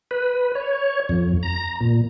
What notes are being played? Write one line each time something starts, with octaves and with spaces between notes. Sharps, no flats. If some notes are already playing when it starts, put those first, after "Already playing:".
B4
C#5
F2
A#5
A#2